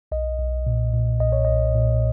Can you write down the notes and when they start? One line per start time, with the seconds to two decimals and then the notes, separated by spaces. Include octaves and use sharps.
0.12 B1 D#5
0.39 B1
0.67 A#2
0.93 A#2
1.20 B1 D#5
1.32 C#5
1.45 B1 D#5
1.75 A#2